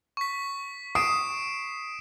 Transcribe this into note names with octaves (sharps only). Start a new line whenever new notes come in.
C#6 B6
D#6 C7 D7 E7